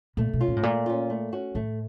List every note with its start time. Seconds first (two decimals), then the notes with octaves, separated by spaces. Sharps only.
0.17 A#2 A3
0.33 B2
0.41 C#4 F4
0.48 A#2
0.56 A2
0.63 A#2 A3
0.86 C#4 F4
1.10 A3
1.32 C#4 F#4
1.55 A2 A3